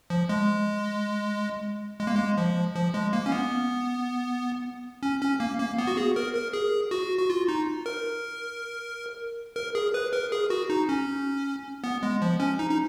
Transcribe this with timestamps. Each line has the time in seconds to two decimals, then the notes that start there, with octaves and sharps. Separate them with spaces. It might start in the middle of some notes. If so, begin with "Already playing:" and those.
0.10 F3
0.29 G#3
2.00 G#3
2.07 A#3
2.15 G#3
2.37 F3
2.76 F3
2.94 G#3
3.13 A#3
3.26 C#4
3.32 B3
5.03 C#4
5.22 C#4
5.40 A#3
5.59 A#3
5.78 B3
5.88 F#4
5.97 G#4
6.16 A#4
6.35 A#4
6.53 G#4
6.91 F#4
7.18 F#4
7.30 F4
7.48 D#4
7.86 A#4
9.56 A#4
9.75 G#4
9.94 B4
10.13 A#4
10.32 G#4
10.50 F#4
10.70 D#4
10.89 C#4
11.84 B3
12.03 G#3
12.22 F3
12.40 C#4
12.59 D#4
12.70 D#4